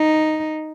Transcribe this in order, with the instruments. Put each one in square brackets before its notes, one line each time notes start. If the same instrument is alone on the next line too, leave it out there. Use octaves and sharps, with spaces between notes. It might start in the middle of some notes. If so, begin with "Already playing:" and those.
Already playing: [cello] D#4